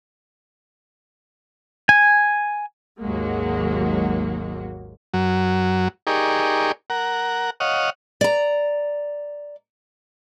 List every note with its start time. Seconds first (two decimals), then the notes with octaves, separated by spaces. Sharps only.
1.89 G#5
3.01 G#1 D#2 F#3 G#3 A#3 F#4
5.14 F#2 F#3
6.07 D#4 G4 G#4 A#4 D5 C#6
6.90 A#4 F#5
7.60 C#5 D#5 F5 F#5
8.21 D5 A#5